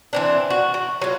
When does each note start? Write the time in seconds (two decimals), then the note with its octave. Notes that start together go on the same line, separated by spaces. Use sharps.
0.13 E3 C4 D4
0.50 F#4
0.74 F#4
1.02 F#3 F4